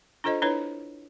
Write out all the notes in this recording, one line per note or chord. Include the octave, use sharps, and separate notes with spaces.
D4 F4 A4 C5 D#5
D4 E4 B4 C#5